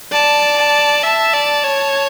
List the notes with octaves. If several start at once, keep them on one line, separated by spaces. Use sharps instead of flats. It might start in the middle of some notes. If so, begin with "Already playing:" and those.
D5 A5
A5
E5 A5
D5
C#5